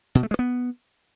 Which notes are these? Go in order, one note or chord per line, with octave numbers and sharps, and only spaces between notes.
B2
A3
G#3
B3